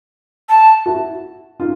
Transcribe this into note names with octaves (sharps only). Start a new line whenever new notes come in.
A5
E4 F#4
D#4 F4